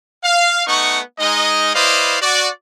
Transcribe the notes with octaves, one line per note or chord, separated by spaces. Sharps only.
F5
A3 B3 D#4 F#5 C#6
G#3 D#4 D#5
E4 B4 C5 D5 D#5 F5
F#4 D5